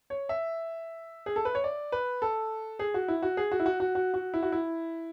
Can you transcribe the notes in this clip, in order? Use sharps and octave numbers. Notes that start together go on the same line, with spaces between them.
C#5
E5
G#4
A4
B4
C#5
D5
B4
A4
G#4
F#4
E4
F#4
G#4
F#4
E4
F#4
F#4
F#4
F#4
E4
F#4
E4